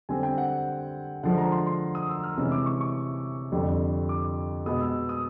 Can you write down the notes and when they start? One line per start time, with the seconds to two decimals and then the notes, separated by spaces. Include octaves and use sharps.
0.09 D3 G3 C4 G#5
0.23 G5
0.38 F#5
1.23 D3 F3 G#3 F#5
1.38 A#5
1.52 C6
1.66 C6
1.95 D#6
2.09 E6
2.23 F6
2.37 C3 E3 G#3 C#4 E6
2.52 D6
2.66 C#6
2.81 C#6
3.52 F2 D3 G3
4.09 D6
4.66 B2 G#3 B3 D#6
4.81 E6
5.09 D#6